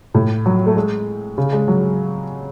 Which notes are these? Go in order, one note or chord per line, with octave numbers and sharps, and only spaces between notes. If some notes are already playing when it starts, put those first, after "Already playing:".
A2
F#3
A3
G#3
C#3
G#3
F#3